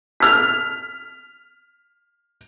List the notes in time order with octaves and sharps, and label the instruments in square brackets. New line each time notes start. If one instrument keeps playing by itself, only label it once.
[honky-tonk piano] F6 B6